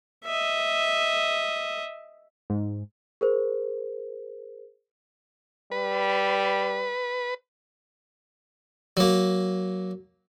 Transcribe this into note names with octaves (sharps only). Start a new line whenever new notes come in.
D#5 E5
G#2
G#4 A#4 C5
G3 B4
F#3 A#3